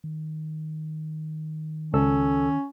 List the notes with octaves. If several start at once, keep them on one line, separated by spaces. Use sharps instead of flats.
D#3
C#2 C#4 A4 E6